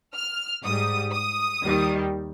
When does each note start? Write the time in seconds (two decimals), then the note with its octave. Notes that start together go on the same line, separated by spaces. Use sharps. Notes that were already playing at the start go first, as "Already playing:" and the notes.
0.15 F6
0.64 G#2 G3 D#6
1.14 D#6
1.64 D#2 D#3 G3